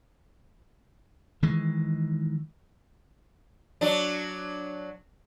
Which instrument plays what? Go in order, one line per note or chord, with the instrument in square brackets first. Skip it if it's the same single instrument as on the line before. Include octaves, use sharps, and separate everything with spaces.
[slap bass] D#3 E3 G#3
[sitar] F#3 D4